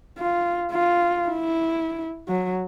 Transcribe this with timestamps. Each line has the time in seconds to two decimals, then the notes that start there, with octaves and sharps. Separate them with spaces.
0.19 F4
0.72 F4
1.29 E4
2.28 F#3